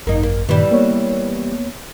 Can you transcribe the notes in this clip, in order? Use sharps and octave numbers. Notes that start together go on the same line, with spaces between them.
G#1 F#2 A#3 D#4
A#3
G2 A#2 D#3 E3 G3
A#3 B3 C#5